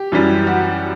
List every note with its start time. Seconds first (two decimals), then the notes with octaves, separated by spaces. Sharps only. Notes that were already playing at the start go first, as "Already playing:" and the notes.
Already playing: G4
0.12 F#2 E3 G3
0.47 F#4